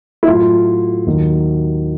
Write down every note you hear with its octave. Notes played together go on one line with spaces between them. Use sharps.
E4
A2 F#3 F4
D#2 D#3 F#3